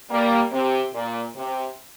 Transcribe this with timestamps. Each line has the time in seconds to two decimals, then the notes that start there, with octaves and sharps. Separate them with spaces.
0.10 G3 A#3
0.52 C3
0.93 A#2
1.36 C3